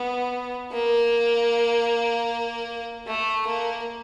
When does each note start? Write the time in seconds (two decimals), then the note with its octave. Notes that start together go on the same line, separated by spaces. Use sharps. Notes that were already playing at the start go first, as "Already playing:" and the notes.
Already playing: B3
0.72 A#3
3.07 A3
3.46 A#3